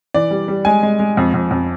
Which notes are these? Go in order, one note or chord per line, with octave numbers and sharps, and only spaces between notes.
E3 D5
G3
G3
G#3 G#5
G#3
G#3
F2
F2
F2